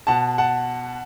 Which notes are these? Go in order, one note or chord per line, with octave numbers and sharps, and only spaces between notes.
B2 F#5 A5
F#5 A5